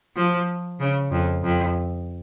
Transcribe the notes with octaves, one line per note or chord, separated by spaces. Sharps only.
F3
C#3
F2
F2